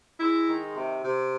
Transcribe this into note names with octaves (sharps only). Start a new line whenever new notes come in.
G#3 E4
D#3
C3
C3